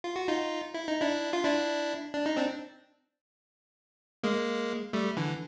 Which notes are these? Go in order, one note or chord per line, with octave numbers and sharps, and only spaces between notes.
F4
F#4
D#4 F4
E4
D#4
D4 E4
F4
D4 E4
D4
D#4
C4 D4
G#3 A#3
G3 A3
D3 E3